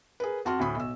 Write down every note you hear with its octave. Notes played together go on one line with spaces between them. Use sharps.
G#4 A#4 B4
F2 F#4 A5 C6 F6
D2 A2 B5 D#6
B1 E6